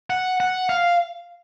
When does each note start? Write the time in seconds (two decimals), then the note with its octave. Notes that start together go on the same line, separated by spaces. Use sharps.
0.10 F#5
0.40 F#5
0.69 F5